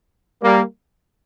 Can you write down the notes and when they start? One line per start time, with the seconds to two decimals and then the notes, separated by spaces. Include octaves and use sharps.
0.42 G3 A#3